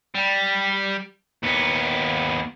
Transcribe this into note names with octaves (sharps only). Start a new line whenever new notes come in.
G3
D#2 B3